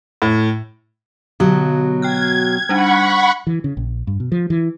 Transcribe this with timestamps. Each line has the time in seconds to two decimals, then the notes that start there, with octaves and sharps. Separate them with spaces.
0.22 A2
1.40 B2 D3 F#3
2.02 G5 F6 F#6 G#6
2.69 G3 D4 D#4 F#5 B5 C#6
3.47 E3
3.64 C#3
3.77 A#1
4.07 G2
4.20 B2
4.32 F3
4.50 E3